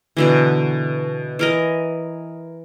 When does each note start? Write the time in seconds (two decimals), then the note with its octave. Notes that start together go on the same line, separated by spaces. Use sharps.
0.17 B2 D3 E3
1.39 E3 A#4 D#5